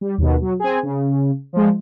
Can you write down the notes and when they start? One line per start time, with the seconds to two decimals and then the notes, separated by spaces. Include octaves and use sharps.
0.01 G3
0.18 D#2 B2
0.41 F#3
0.60 C4 G#4
0.83 C#3
1.53 F3 G#3